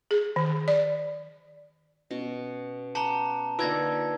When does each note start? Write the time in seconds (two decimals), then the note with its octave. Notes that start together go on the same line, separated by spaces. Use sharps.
0.11 G#4
0.36 D#3
0.68 D5
2.11 B2 C#4
2.95 F#5 G5 A5 A#5 D6
3.59 D3 A#3 D#4 F4 B4 E6 G#6 A#6